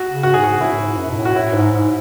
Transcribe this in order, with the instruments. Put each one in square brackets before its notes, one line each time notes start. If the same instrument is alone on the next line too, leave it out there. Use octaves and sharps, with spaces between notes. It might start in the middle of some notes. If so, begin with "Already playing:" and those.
Already playing: [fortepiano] F#4
[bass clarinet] C#3
[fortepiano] F#4
[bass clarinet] G#2 [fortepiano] G#4
[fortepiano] F#4
[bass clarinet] A2 [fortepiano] E4
[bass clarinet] A2
G#2
F#2
B2
A2
[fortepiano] F#4
[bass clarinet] A2 [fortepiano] E4
[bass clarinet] G#2
G#2